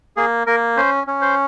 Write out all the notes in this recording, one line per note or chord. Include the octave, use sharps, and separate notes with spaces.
A#3 G#4
A#3 A#4
C#4 C5
C#4
C5